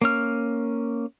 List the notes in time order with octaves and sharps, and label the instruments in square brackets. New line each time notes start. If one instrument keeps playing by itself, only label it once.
[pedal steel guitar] A#3 C#4 F6